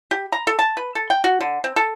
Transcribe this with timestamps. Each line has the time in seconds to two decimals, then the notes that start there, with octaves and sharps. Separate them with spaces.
0.11 G4
0.32 A#5
0.47 A4
0.59 A5
0.77 B4
0.95 A4
1.10 G5
1.24 F#4
1.41 D3
1.64 C4
1.76 A4